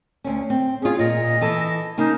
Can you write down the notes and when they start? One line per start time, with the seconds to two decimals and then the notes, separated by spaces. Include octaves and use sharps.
0.24 D2 C#4
0.50 C4
0.82 C#4 F4 G#4
0.99 A#2 D#5
1.41 E3 A4
1.98 C#3 A#3 D#4